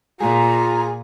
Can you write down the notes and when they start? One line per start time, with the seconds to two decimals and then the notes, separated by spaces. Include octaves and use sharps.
0.20 A#2 F4 G#4 A#5